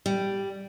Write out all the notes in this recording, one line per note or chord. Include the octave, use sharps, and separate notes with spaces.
G3